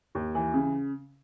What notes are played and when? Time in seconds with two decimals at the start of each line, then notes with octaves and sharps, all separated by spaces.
0.15 D#2
0.35 E3
0.54 C#3